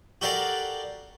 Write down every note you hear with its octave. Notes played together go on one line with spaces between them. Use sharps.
F#4 G4 A4 A#4 D5 F5